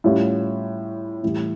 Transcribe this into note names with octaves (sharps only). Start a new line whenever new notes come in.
A2 G3 C#4 F4
A2 E3 G3